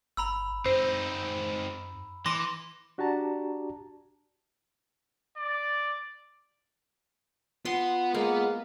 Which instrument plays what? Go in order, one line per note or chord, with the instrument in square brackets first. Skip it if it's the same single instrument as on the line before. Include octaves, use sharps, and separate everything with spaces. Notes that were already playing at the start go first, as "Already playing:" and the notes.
[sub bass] G1 [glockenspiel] A#5 B5 E6
[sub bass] F#2 [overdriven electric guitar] C4 D#4 [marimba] C5
[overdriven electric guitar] E3 [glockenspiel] C6 D6 A#6
[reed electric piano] D4 F#4 G4 D5 A5 A#5
[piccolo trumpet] D5
[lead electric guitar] B3 F#5 [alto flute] F4 [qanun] C6
[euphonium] G#3 [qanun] A#3